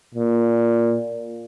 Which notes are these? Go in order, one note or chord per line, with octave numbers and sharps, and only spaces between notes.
A#2